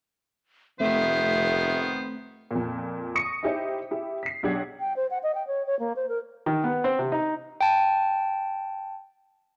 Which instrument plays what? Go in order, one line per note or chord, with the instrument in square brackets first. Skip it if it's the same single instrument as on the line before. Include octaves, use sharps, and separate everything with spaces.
[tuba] F1 [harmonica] D#3 B3 C5 [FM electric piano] A3 C4 [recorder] E5
[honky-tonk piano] F2 A#2
C#6 D#6 A#6 C#7
D#4 E4 G4 C5 D#5
E4 G4
B6 C7
B1 D4 G4 F#5 G#6
[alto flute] G5
C5
F#5
D#5
G5
C#5
C#5
A#3
C5
A#4
[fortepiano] D#3
B3
C4
C3
D#4
[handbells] G5 A5